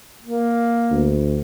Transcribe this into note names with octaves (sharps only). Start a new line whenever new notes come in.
A#3
D2